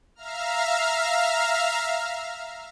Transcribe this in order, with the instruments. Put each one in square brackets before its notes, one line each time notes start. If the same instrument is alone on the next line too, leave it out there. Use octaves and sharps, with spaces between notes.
[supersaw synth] E5 F5 A#5 F6